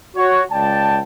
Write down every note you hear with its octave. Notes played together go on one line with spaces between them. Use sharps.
F#4 C#5
C#2 D5 G5 A5